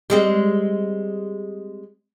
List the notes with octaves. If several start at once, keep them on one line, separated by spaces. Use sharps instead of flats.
G3 G#3 C4